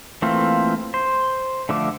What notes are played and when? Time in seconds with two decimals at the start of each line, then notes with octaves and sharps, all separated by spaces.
0.22 E3 A3 A#3 C4 F4
0.94 C5
1.69 D3 F3 A3 D6